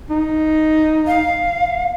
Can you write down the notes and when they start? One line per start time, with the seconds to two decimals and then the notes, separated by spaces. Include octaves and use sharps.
0.11 D#4
1.07 F5